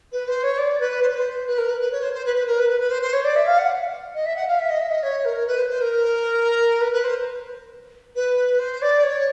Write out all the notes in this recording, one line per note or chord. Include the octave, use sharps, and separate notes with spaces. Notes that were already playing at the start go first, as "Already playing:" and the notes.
B4
C5
C#5
D5
B4
C5
B4
C5
B4
A#4
B4
B4
C#5
C5
C5
B4
B4
A#4
B4
B4
B4
C5
C5
C#5
D5
E5
F5
F#5
D#5
E5
F#5
F5
E5
D#5
E5
D#5
C#5
A#4
B4
C5
C5
A#4
B4
B4
C5
B4
C5
D5
C#5